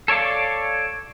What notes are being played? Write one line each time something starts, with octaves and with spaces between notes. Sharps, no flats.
A4 C#5 D5 F5 D6